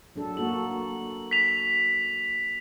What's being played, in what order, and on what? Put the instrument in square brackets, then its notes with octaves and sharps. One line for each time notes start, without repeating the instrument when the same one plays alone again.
[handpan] F#3 D4 A4
[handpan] A#3 F#4 A4 [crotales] F#7
[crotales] B6 F7